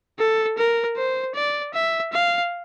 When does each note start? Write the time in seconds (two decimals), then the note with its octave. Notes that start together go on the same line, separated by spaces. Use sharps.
0.19 A4
0.58 A#4
0.97 C5
1.35 D5
1.74 E5
2.12 F5